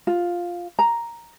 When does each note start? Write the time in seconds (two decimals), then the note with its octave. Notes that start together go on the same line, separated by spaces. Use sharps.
0.07 F4
0.79 A#5